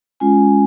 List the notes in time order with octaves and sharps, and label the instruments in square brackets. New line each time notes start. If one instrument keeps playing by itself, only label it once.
[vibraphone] G#3 C#4 F4 G#5